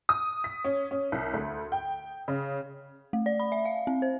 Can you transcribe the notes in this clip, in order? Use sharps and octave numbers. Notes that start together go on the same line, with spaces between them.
D#6
B6
C#4
C#4
C2
D2
G5
C#3
A3
D5
B5
E5
F5
C4
C5